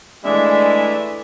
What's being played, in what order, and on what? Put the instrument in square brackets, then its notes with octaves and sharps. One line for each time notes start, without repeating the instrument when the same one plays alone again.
[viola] E3 A3 [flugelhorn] G#3 [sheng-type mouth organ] D4 E5